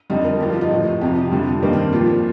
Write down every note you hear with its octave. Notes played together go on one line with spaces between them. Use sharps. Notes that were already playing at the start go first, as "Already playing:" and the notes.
F2 D3 G3 D#4
A#4
G2 D3 F3 G4
F4
D#4
A2 F3
F2 C3 F3 G4
F2 D3 G3
G2 D#3 G3 A#3
C4
A#2 F3 F4